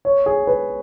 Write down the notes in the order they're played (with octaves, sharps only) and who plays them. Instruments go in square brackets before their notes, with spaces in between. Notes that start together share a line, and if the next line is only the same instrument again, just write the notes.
[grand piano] C#5
G#4
B4